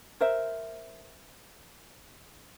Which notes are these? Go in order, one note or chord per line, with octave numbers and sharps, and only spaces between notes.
A#4 C5 E5